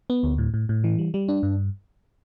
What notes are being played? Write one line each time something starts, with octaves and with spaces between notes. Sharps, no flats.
B3
D2
A2
A2
A2
E3
G3
G3
D4
G2